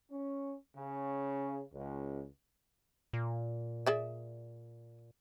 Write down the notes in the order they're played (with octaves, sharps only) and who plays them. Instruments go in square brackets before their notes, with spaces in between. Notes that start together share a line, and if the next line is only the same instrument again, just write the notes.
[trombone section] C#4
C#3
C#2
[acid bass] A#2
[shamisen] G#4 D5 E5